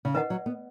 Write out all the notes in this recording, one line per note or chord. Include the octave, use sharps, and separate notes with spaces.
C#3
D#3 B4 D#5 F#5
F#3
B3